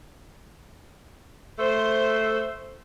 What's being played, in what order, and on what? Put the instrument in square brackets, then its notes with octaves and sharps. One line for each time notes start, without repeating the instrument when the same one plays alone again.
[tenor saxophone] A3 [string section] C5